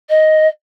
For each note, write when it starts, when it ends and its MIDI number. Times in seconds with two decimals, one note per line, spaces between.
0.10 0.47 75